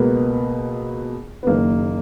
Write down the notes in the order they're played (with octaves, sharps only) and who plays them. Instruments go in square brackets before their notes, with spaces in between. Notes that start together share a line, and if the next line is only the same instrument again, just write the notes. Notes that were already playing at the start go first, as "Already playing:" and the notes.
Already playing: [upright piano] C#2 B2 A#3 [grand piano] B3
[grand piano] B3
[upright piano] F#1 F#2 D#3 [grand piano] A#3